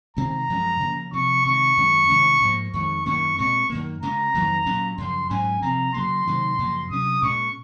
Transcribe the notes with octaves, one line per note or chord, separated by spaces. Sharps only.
C3 D#3 G#3 C4 A#5
F#2 F3 G#3 C#4
C#3 F3 A#3 C#4
C3 F3 C4 C#6
C3 D#3 G#3 C#6
F#2 D#3 G#3 C#4
C3 D#3 G#3 C#4
G#2 F3 A#3
F2 D#3 G#3 C#6
F#2 D#3 A#3 C#4 C#6
A#2 G#3 C4 C#6
F#2 D#3 A#3
C#3 G#3 C#4 A#5
F2 D#3 F#3 A#3
A#2 F#3 C#4
F#2 C#3 F3 C6
G#2 F#3 C#4 G#5
C3 F3 C4 A#5
C#3 F#3 A#3 C6
C3 D#3 F#3 A#3
F#2 C#3 F3 A#3
C3 F#3 C#4 D#6
A#2 G#3 C#4 C#6